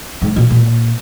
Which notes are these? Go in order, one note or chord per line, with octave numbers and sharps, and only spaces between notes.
G#2
A#2
A#2